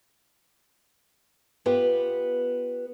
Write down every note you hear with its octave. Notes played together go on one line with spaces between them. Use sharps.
B3 F4 G4 B4